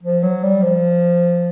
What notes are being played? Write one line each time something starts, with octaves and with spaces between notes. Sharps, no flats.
F3
F#3
G3
F3